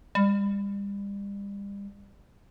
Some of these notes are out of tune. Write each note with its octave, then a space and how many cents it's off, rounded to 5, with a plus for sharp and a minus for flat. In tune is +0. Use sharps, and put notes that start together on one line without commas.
G3 +35